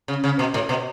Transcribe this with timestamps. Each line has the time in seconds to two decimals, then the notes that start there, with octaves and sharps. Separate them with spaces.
0.08 C#3
0.24 C#3
0.39 B2
0.54 A2
0.69 B2